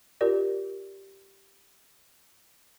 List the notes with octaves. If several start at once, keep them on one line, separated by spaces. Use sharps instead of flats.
F4 G4 A#4 D5